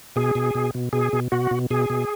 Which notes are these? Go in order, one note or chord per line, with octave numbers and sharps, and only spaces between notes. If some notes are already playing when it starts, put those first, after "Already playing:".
B2 G#4
B2
B2
B2
B2 G#4
B2
B2 F#4
B2
B2 G#4
B2